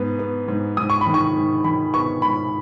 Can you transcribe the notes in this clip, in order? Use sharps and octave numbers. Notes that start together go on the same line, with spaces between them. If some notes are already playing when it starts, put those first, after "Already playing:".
Already playing: G#2 B3
B3
G#2
G#2 D#6
C#6
B5
D#3
C#6
G#2
D#3 B5
B3 C#6
G#2 B5